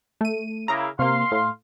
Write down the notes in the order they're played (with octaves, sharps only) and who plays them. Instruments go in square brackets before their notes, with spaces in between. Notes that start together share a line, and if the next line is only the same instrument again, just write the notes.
[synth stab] A3 D#7
[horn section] C#3 A#3 E4 [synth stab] A#5
[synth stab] C3 A#3 [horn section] F5 C6
[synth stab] A2